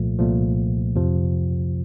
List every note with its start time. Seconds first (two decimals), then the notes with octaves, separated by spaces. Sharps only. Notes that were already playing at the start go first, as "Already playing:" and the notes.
Already playing: C2 A#2 F3 A3
0.19 C2 A#2 F3 A3
0.96 F2 C3 F3